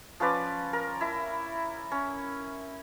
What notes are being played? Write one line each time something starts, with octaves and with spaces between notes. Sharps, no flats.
F3 C#4 B4 D5
A#4
E4
C#4